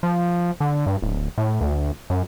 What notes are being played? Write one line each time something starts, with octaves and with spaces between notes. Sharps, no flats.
F3
D3
G2
D1
A2
D2
F#2